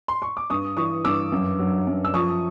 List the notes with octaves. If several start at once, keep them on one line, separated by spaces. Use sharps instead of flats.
C6
C#6
D6
G2 C#6 D#6
E3 C#6 D#6
G2 D6 E6
F#2
F#3
F#2
E6
F3 C#6 D#6